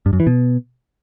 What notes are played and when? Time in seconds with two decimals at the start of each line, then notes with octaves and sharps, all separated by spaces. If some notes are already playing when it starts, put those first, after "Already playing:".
0.06 G2
0.13 F#2
0.20 E3
0.27 B2